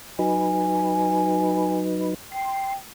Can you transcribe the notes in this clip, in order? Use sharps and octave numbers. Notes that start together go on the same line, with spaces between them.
F#3 D#4 B4 G#5
G5 C6